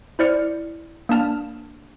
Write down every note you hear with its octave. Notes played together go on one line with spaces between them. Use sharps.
E4 C5 D5 F6 C#7
A#3 D4 A5 F6